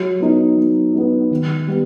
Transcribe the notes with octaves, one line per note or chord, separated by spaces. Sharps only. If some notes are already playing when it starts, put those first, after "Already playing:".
Already playing: F#3
B3 D#4
F#3
B3 D#4
D#3
G3 B3